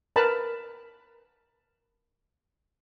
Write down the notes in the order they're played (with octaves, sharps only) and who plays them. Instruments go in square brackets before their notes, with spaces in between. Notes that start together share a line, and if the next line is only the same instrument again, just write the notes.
[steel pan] A#4 B4 A5 B5